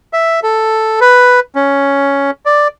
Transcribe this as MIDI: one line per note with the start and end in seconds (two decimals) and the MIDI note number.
0.13 0.40 76
0.43 1.00 69
1.01 1.40 71
1.55 2.31 61
2.46 2.68 74